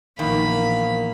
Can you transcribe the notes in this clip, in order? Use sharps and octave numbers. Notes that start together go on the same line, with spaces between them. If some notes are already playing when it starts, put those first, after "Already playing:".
A#1 E2 A#2 D#3 A#3 F5 B5